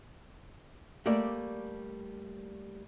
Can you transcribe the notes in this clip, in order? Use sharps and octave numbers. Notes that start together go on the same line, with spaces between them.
G3 A3 A#3 G4 D5